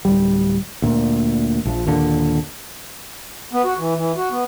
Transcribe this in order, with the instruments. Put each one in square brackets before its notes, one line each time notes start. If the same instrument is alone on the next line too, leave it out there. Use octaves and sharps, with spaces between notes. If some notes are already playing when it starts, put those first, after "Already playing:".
[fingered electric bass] D1 G3
D2 A#2
A#1 F3
D#2 A#2 D3
[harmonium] B3
F#4
E3
E3
F#4
B3